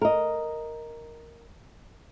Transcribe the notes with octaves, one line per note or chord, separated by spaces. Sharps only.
A#4 D#5